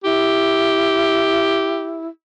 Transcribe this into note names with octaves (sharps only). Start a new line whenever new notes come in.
E4 G4